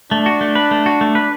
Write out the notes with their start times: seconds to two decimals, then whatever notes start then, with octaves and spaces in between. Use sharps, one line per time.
0.11 A3 D4
0.26 F#4
0.41 A3
0.55 B4
0.71 A3
0.86 F#4
1.01 A3
1.15 B4